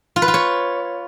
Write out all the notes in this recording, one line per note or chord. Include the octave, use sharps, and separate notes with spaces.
F4
B4
F4
C#5